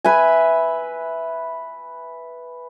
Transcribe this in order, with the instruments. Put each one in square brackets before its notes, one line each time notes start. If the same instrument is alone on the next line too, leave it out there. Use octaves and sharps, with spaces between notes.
[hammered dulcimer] B4 E5 G#5